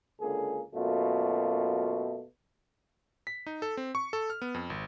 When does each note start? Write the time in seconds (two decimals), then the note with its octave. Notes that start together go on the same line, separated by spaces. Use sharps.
0.21 C#2 D3 A#3 G#4
0.74 F#2 B2 A3 A#3 F4
3.27 B6
3.46 D#4
3.62 A4
3.77 C4
3.95 C#6
4.13 A4
4.30 F6
4.42 B3
4.54 F2
4.70 G#1